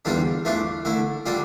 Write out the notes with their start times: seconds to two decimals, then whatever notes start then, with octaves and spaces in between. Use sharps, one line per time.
0.05 E2 D3 G3 D4 F4
0.45 E3 A3 D4 F4
0.85 D3 A3 E4
1.26 D3 G3 D4 F4